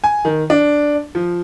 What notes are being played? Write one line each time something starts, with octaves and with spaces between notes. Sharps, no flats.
G#5
D#3
D4
F3